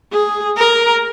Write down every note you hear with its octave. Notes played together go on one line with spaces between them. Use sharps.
G#4
A#4